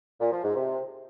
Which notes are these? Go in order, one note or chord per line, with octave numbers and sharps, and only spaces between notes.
A#2
F3
G#2
C3